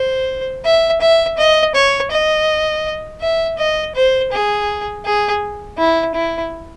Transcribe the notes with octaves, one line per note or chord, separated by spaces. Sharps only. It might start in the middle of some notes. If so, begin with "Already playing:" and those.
Already playing: C5
E5
E5
D#5
C#5
D#5
E5
D#5
C5
G#4
G#4
E4
E4